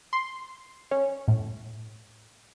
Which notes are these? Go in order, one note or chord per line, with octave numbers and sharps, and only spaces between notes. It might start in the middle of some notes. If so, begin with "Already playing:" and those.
C6
C#4
A2